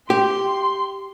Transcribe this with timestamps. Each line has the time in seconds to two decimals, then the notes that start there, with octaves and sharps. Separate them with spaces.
0.10 G4 C6